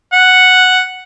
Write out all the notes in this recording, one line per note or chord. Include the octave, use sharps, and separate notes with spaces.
F#5